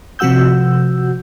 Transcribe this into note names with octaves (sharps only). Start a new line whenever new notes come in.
C3 F3 F#4 F#5 E6 G6